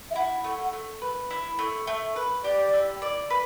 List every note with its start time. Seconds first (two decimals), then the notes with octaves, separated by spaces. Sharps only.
0.11 E5
0.16 E4 F#5
0.44 A3
0.73 A3
1.02 B4
1.31 E4
1.59 A3
1.87 A3 E5
2.16 B4
2.44 G4 D5
2.73 E4
3.02 D5
3.30 B4